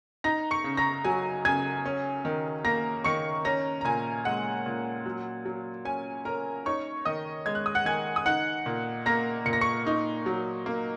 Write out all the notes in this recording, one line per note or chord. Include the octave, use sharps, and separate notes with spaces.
D#4 A#5 A#6
C#6 C#7
C#3
A#5 A#6
F#3 G#5
C#3 G#5 G#6
C#4
D#3
A#3 A#5 A#6
D#3 C#6 C#7
C#4 A#5 A#6
A#5
A#2 G#5
G#3 F#5
A#2
F#3
F#3
C#4 G#5
C#4 A#4 A#5
D#4 C#5 C#6
D#3 D#5 D#6
G#3 G#6
F#6
D#6
F#5 F#6
D#3 G#5 G#6
D#6
D#4 F#5 F#6
A#2
A#3 A#5 A#6
A#2 C#7
A#6
C#6 C#7
D#4
F#3
A#3